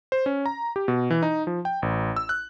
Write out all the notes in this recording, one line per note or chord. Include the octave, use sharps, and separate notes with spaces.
C5
C#4
A#5
G4
B2
E3
D#4
F3
G5
A1
E6
F#6